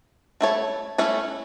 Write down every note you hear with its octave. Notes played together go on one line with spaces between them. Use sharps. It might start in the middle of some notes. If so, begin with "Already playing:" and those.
A3 E4 A4 C#5
A3 C#4 E4 A4 C#5